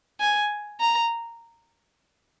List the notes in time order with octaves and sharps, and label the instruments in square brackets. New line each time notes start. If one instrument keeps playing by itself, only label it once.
[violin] G#5
A#5